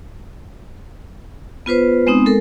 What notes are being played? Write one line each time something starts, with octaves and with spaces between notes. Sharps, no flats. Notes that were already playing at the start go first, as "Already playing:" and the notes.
B3 F4 B4 C5
G#3 B3 C4 D#4 D#6
G#3 A4 A#4